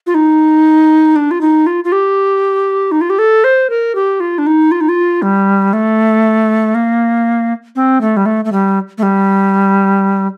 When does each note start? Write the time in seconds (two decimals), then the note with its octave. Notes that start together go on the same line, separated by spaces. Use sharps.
0.07 F4
0.14 D#4
1.16 D4
1.31 F4
1.41 D#4
1.67 F4
1.84 F4
1.92 G4
2.92 D#4
3.01 F4
3.10 G4
3.19 A4
3.44 C5
3.70 A#4
3.95 G4
4.20 F4
4.38 D4
4.46 D#4
4.71 F4
4.81 D#4
4.89 F4
5.22 G3
5.73 A3
6.75 A#3
7.76 C4
8.01 A3
8.17 G3
8.26 A3
8.45 A3
8.52 G3
8.98 A3
9.03 G3